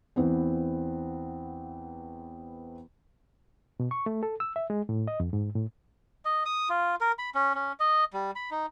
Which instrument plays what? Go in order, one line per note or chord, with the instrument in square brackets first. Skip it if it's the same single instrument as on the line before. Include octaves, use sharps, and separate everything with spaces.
[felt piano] E2 E3 B3 C4
[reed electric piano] B2
C#6
A3
A4
E6
E5
G#3
A2
D#5
F2
G#2
A2
[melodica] D#5
D#6
F4
A#4
B5
C#4
C#4
D#5
G3
B5
D#4